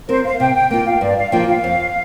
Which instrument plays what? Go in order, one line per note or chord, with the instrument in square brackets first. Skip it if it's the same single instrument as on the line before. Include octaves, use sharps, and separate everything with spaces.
[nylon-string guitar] C4 A#4 [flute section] C5
[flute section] F5
[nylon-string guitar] C3 [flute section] G5
[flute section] G5
[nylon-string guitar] A#3 F4 [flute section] G5
[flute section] F5
[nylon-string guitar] G2 [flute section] D5
[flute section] F5
[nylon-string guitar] F3 A#3 F4 [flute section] G5
[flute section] F5
[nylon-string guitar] F2